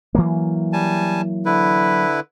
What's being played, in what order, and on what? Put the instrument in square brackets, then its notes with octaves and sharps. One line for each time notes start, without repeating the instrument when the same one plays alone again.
[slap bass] E3 F#3 A#3
[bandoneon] G3 G#5 A5
D3 E4 B4